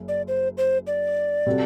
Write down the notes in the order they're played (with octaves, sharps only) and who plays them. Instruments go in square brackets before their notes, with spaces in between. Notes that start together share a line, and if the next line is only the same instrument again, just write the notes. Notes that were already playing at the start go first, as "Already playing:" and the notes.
Already playing: [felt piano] F#1 F#2
[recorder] D5
C5
C5
D5
[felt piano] C3 G3 C4 F#4 A4